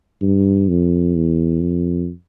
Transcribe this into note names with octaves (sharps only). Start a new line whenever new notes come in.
G2
F2
E2
F2